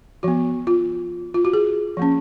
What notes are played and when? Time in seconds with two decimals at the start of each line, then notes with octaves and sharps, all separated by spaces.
0.23 F3 B3 F#4
0.67 F4
1.34 F4
1.45 F#4
1.53 G#4
1.97 F3 A#3 C#4